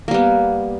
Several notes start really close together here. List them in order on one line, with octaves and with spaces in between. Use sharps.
A#3 G3 B3